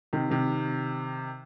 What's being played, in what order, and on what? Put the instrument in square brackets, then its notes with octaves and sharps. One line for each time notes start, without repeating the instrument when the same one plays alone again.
[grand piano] C3 D#3
C3 D#3